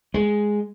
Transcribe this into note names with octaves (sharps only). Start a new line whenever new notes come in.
G#3